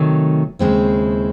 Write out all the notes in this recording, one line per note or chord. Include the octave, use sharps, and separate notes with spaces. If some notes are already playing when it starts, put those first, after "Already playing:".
Already playing: C3 D#3 F#3 A3
D#2 C#3 G#3 C4 E4